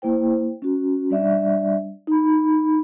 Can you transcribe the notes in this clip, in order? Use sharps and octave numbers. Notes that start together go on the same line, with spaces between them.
A#3 E4 C5 G5
C#4 F#4
G3 D4 D5 E5
D#4 B5